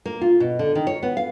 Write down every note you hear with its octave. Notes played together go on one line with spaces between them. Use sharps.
A#3
F4
B2
D3
D#3
C#5
B3
F5